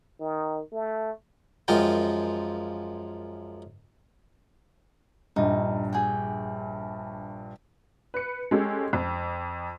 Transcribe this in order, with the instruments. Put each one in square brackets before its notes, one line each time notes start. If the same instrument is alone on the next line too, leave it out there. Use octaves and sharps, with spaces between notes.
[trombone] D#3
A3
[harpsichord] F#2 F3 G#3 F4 A#4 G5
[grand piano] A#1 G2 [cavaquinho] D#4
[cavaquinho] G#4 F#5 G5
[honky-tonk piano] B4 C#7
G#3 C#4 G4 A4
F2